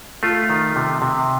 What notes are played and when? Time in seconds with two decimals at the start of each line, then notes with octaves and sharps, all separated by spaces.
0.23 A3 F4
0.49 D#3
0.76 C3
1.02 C3